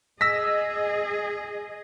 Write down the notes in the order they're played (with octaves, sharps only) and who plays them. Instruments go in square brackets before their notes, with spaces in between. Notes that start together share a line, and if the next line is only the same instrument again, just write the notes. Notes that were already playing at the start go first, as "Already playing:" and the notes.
[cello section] G#4 D#5 [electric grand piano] E6 A#6 B6